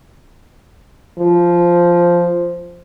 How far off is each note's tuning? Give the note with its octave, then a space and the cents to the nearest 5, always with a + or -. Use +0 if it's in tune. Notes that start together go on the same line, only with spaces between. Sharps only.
F3 -5